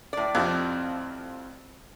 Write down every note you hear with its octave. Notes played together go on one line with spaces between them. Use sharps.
A2 D5
F2 C3 F3